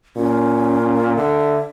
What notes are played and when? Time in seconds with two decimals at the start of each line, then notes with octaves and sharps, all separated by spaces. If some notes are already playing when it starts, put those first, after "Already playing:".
0.17 A#2 C#4
1.17 D3 E5